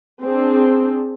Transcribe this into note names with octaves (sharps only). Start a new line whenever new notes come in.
C4 D4 G#4